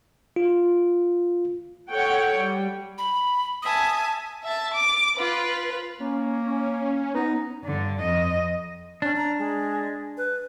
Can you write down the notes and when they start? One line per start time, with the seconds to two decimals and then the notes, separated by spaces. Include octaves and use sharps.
0.36 F4
1.90 A4 C#5 F#5 G5
2.35 G3
2.98 B5
3.62 E5 G#5 A5 D#6
4.43 E5 A5
4.74 D6
5.17 F4 B4
6.00 A#3 C#4
7.15 B3 D#4
7.64 G2 D3
8.01 F2 D#5
9.02 C#4 D4
9.16 A#5
9.38 G#3
10.17 B4